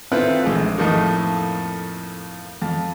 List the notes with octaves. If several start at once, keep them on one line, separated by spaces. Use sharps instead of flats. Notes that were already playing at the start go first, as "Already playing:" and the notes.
D#3 C4 E4 F4 A4 B4
A#1 G#3 A3
F2 A2 F3 A3 A#3 D#4
F2